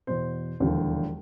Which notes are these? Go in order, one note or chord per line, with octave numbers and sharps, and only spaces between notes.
E2 B2 C5
E1 D#2 D3 F3